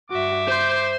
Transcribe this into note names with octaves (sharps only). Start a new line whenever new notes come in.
G2 F#4 E5 D6
C5 C6 G6